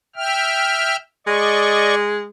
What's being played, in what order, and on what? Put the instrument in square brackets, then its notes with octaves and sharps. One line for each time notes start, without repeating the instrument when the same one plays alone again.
[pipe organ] E5 G5 F6
[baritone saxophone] G#3 [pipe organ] D5 D#5 C#6